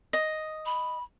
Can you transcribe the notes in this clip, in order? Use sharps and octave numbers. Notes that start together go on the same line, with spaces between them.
D#5
B5